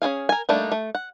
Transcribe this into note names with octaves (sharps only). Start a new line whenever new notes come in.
C#4 E4 G#4 F5
A#4 G#5
G3 A3 A#3 D4 D#4
A3
F#5